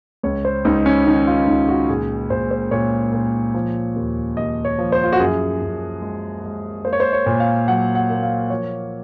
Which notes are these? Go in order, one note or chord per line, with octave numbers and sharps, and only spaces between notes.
C#2 C#5
C5
C#2 D#4
C#4
D#3 D#4
F4
C#2 D#4
F#4
A#2 G#4
A#2 C5
C5
A#2 C#5
A#2
F3
D#2
D#2 D#5
C#5
F3
C5
F4
F#4
F#2 G#4
F#2
G#3
G#3
A#3 C5
C#5
C5
C#5
A#2
F5
F#3 F#5
F#5
A#3
F5
F3 C#5